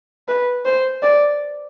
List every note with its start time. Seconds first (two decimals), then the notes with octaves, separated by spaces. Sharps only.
0.28 B4
0.65 C5
1.03 D5